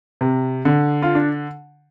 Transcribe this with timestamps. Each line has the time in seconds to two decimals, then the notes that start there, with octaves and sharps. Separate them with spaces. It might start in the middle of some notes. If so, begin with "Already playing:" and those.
0.21 C3
0.65 D3
1.02 F4
1.15 D4